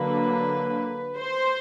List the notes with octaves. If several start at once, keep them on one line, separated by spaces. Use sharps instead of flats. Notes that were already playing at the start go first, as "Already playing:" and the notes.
Already playing: D3 F#3 A#3 B4
C5